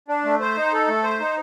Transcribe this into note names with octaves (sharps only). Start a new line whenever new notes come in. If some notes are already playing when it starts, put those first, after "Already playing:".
D4
A3
C5
D#4
A4
A3
C5
D#4